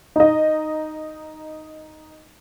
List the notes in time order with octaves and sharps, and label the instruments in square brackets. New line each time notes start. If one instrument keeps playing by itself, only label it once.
[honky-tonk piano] D#4 D#5